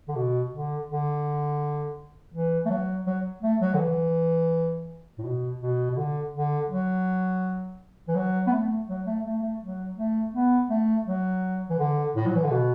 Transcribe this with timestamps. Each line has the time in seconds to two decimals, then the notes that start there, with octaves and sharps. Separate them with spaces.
0.08 D3
0.16 B2
0.52 D3
0.88 D3
2.34 E3
2.66 A3
2.70 F#3
3.07 F#3
3.42 A3
3.61 F#3
3.74 D3
3.79 E3
5.18 A2
5.25 B2
5.61 B2
5.91 B2
5.97 D3
6.34 D3
6.70 F#3
8.09 E3
8.15 F#3
8.47 B3
8.52 A3
8.89 F#3
9.07 A3
9.25 A3
9.43 A3
9.61 F#3
9.97 A3
10.33 B3
10.70 A3
11.07 F#3
11.70 E3
11.79 D3
12.16 A2
12.27 F#3
12.36 E3
12.44 D3
12.51 B2